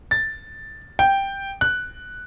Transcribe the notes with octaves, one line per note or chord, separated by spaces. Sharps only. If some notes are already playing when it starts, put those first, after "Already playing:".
A6
G5
F#6